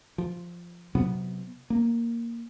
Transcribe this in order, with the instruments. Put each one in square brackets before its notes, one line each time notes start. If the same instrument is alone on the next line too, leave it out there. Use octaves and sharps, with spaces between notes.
[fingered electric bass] F3
C3 F#3 B3
A#3